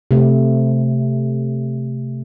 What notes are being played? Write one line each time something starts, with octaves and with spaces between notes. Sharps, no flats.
C3 A3